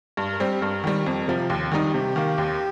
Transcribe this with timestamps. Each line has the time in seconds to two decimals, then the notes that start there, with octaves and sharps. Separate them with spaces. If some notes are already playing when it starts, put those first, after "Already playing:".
0.17 G2
0.32 A#4
0.40 G3 C4 G4
0.61 G2 A#4
0.84 D#3 G3
1.00 F4
1.05 F2 G4
1.21 A#4
1.28 C3 F3
1.36 G4
1.50 D#2
1.72 D#3 G3 D#4
1.94 C3 G4
2.16 D#3 A#3
2.38 D#2